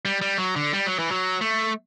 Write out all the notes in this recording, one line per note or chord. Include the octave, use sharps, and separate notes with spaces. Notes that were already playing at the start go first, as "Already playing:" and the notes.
G3
G3
F#3
D3
G3
F#3
E3
F#3
A3